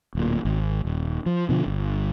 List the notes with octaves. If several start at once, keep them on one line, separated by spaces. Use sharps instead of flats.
D1 A#2
G#1
D#1
F3
B2 D3 F3
G1